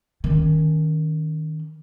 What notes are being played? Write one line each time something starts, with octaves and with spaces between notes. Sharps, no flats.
D#3 C#4